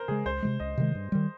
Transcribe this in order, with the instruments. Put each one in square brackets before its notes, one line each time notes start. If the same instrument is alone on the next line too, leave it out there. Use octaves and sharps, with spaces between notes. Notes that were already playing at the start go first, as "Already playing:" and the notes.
Already playing: [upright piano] A#4 C5
[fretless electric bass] C#3 G#3 [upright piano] G#4
[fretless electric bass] C#2 [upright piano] C5
[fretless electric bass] C3 D#3 G#3
[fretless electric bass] C#2 [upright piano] D#5
[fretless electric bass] C3 D#3 G#3
G2
D#3 G3